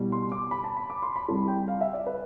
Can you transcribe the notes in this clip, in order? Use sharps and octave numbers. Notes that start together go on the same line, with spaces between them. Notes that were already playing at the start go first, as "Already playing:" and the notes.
Already playing: C2 B2 G3
C6
D6
B5
A5
B5
D6
C6
B5
C2 C3 G3 A5
G5
F5
E5
D5
B4